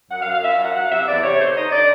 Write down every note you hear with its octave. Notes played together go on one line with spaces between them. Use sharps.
F#2 F#5
F5
F#2
F5
F#2 E5
F5
F#3 F#5
F#3 F#5
F5
C3 E5
E2 D5
C3 C#5
D3 C5
D#4 D#5
D3 D5